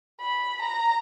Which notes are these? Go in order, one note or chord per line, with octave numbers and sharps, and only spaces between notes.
B5
A#5